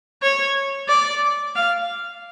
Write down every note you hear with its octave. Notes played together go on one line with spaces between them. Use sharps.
C#5
D5
F5